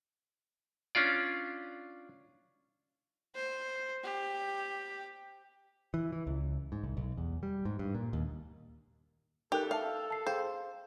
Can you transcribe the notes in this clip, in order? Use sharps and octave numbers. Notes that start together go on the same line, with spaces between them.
C#4 D4 F4 D5
C5
G4
E3
E3
C#2
G#2
C2
B1
E2
G3
G#2
G2
A#2
D#2
D#4 G4 A4 A#4 F#6
E5 F5 A5
A5 C7
G#4 C5 F5 G5